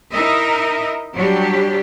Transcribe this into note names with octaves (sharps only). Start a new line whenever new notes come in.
D#4 E4 A#4 D#5 E5
F#3 G3 D4 G4